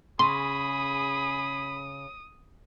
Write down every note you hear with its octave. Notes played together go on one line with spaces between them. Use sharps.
C#3 G#4 B5 C6 D#6